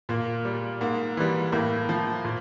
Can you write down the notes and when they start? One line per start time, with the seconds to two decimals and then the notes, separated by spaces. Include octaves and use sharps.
0.09 A#2 A#3
0.45 G3
0.81 G#2 A#3
1.17 E3 G3
1.52 A2 A#3
1.89 F3
2.24 A#2